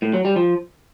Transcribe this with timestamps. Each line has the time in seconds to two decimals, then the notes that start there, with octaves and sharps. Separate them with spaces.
0.02 A2
0.13 F#3
0.25 G3
0.36 F3